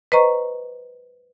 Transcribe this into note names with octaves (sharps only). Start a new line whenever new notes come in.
B4 C5 D#5 A#5 C#6